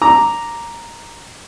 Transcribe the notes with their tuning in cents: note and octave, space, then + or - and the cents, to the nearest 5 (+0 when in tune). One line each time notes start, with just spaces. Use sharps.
A#5 +0 D6 +0